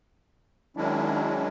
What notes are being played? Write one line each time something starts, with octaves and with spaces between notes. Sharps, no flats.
D#3 F#3 G#3 C#4 D4 E4